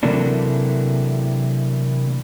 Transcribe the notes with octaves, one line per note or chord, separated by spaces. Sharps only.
C3 E3 F#3 A3 A#3 D4